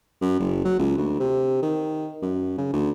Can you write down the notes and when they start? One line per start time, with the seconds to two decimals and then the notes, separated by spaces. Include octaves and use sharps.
0.22 F#2
0.40 F#1
0.65 F#3
0.79 C#2
0.98 D2
1.20 C3
1.63 D#3
2.22 F#2
2.58 C#3
2.73 D2